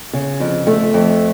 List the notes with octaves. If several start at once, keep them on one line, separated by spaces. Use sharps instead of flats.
C#3
F2
A3
F2